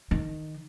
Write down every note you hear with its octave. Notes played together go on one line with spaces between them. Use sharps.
D#3